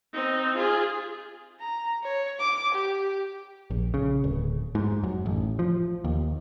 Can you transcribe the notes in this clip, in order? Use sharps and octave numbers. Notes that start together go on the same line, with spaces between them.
C4 D#4
F4 G#4
A#5
C#5
D6
G4
A#1
C#3
D1
G#2
F#2
A1
F3
D#2